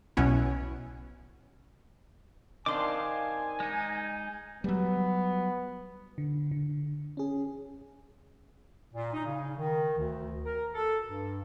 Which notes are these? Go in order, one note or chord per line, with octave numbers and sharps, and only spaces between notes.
B1 B2 B3 C#4 E4
D#3 C4 D4 D#5 F5 G#5 C6 D6
G#3 D#4
F#3 G3 B3
D3
D3
C#4 G#4
A#2
D#4
C#3
D#3
D2
A#4
A4
G2